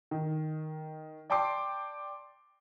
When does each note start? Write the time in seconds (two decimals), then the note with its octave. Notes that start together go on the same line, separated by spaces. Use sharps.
0.11 D#3
1.30 D5 G5 A5 C6 D6 C7